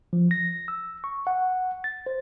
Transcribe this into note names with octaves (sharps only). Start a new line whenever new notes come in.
F3
A#6
E6
C#6
F#5
A6
C5